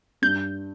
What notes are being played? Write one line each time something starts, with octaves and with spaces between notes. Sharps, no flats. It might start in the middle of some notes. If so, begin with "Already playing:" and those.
G2 G6